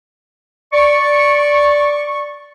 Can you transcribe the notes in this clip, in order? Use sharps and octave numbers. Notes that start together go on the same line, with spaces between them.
D5 C#6